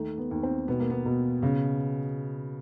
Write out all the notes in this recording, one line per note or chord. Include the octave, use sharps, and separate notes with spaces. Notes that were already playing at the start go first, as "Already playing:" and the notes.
Already playing: D#2 D#3 A3
B3
D#2
C4
B2 B3
A#3
B3
B2
C#3